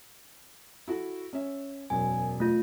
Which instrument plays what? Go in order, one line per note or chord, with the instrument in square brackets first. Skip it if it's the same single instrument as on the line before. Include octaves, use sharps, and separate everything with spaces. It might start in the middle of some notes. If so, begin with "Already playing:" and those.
[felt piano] E4 F#4 A4
C#4 E5
[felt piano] E1 F#2 [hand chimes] G#5
[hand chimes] A3 F4